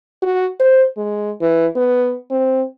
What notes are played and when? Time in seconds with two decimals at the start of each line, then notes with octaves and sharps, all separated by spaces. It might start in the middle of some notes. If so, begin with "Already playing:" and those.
0.22 F#4
0.59 C5
0.97 G#3
1.41 E3
1.76 B3
2.30 C4